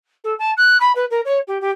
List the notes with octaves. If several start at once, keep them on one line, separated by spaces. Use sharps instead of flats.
A4
A5
F#6
B5
B4
A#4
C#5
G4
G4